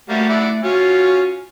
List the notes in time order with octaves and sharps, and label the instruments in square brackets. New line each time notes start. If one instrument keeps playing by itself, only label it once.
[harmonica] G3 A#3 F#4 [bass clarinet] A3
[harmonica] E4 D5 F#5
[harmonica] C#4 F4 [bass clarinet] F#4